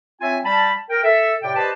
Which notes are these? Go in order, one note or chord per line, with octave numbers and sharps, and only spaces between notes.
C4 F4 C#5 E5 G#5
G3 A5 B5
A#4 G5
A4 E5
A2 C3 G4 D5 G5
G4 B4 C5 D5 D#5 A5